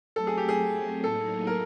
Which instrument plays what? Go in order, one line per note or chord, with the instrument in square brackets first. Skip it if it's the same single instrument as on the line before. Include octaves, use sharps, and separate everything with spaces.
[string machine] F#3 A3 C4 [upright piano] A4
[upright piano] G#4
G4
G#4
[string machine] A2 F#3 A#3 D#4 G#4 [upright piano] A4
[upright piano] A#4